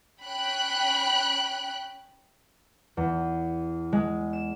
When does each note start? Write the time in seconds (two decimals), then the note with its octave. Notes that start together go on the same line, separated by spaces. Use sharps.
0.22 C#4 G5 B5 F#6
2.97 E2
3.93 G#3
4.33 E7